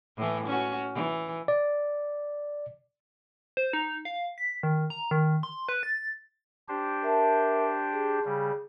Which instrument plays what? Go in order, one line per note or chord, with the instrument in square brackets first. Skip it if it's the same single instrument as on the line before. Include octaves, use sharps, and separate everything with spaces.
[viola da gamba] A2 E3
C#4 F#4
E3
[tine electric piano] D5
[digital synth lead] C5
D#4
F5
B6
D#3
A#5
D#3
C6
B4
A6
[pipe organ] D4 G4 C5
[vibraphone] A#4 E5 A5
G#4
[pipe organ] C#3 G3